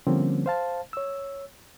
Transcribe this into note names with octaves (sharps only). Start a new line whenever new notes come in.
D3 F3 G3 A#3 C4 C#4
C5 F5 A5
C#5 E6